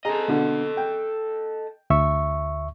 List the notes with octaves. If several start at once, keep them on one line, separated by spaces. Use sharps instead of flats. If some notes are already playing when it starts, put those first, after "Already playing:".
G#4 A4 D#5 A#5
B2 D3
G5
D2 E5 C#6